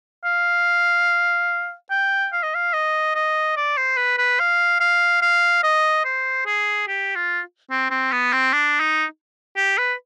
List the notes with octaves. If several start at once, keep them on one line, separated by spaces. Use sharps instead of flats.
F5
G5
F5
D#5
F5
D#5
D#5
D5
C5
B4
B4
F5
F5
F5
D#5
C5
G#4
G4
F4
C4
C4
B3
C4
D4
D#4
G4
B4